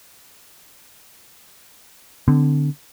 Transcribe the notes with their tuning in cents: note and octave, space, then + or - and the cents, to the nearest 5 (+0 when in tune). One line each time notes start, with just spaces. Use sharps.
D3 +0 C4 -45